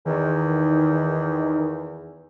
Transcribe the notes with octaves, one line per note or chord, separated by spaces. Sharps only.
E2 D#3